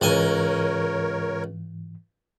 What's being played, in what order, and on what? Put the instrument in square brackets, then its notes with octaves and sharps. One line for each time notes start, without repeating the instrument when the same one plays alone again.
[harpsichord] C#2 D#5 G#5 [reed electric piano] G#2 E3 [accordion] A#4 C#5